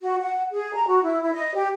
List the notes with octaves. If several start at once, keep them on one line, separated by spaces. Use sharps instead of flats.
F#4
F#5
G#4
A#5
F#4
E4
E4
D#5
G4